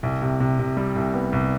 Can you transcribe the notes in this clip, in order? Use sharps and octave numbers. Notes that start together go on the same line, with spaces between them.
C2
C3
C3
C3
G3
C2
B3
C2